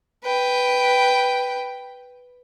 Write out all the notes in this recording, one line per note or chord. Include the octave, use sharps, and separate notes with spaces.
B4 G5